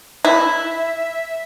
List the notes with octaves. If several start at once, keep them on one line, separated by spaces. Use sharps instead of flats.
E4 E5